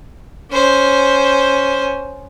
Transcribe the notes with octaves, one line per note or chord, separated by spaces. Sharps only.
C#4 C5